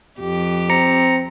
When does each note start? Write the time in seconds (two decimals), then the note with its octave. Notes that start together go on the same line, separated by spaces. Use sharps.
0.20 F2 G4
0.70 C4 A#5 C#7